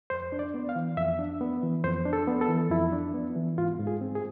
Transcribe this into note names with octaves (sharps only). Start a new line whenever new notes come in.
F2 C5
D4
D5
B3
F5
E3
F2 E5
D4
B3
E3
F2 C5
D4
A4
B3
A4
E3
F2 E4
D4
B3
E3
G#2 F4
G#2
G#4
C4
G#4